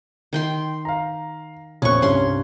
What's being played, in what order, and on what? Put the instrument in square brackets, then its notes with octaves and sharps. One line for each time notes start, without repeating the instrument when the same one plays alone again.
[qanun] D#3 G5 C6
[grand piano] F5 A#5
[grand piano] A#1 E2 F#6 [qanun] C#4 C#6
[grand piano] C2 G2 [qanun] C#4 C6